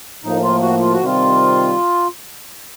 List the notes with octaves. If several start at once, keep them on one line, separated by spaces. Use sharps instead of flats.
A2 F3 A#3 D#4
F4
F#4
F4
F#4
C3 D#3 G3 C4 F4